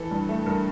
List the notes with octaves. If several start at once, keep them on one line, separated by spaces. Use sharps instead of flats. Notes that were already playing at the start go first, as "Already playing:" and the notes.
Already playing: E3 A4
G2
A3
G2 A#4